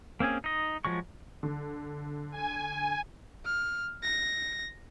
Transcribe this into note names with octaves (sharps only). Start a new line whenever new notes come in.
A#3 C4 C#4 G#4
D#4 D#5
F3 F#3 G#3 C#6
D3
G#5
F6
A#6